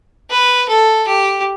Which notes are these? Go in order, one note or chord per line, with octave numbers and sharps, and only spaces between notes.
B4
A4
G4